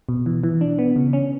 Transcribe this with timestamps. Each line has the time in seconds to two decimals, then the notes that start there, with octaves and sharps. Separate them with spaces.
0.09 B2
0.26 E3
0.44 E3
0.61 D4
0.79 B3
0.96 C#3
1.13 C#4